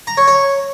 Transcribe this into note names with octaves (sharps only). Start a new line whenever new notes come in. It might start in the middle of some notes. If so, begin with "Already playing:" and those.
A#5
C#5
C#5